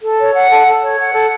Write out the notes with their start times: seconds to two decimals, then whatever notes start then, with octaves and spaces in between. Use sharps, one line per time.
0.02 A4
0.18 C#5
0.34 F#5
0.50 A4
0.66 A4
0.82 C#5
0.98 F#5
1.13 A4